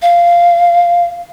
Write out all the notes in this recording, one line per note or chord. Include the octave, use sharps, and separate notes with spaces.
F5